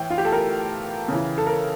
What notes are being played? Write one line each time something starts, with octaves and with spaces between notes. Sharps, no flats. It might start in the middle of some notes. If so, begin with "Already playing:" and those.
Already playing: A2 E3 G5
F4
G4
A4
A#4
C#3 E3
A4
A#4